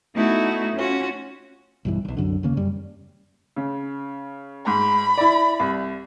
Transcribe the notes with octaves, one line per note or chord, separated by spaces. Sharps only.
A3 B3 D#4 E4 F#4
C#4 F4 F#4
B1 G2 E3
E1 B1
C2 F#2 D3
D#2 C#3 A#3
F#2 G3
C#3
G#2 B5
E4 D5
C2